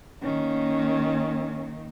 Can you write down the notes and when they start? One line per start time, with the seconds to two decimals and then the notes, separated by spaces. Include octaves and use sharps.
0.23 D#3 A#3 C#4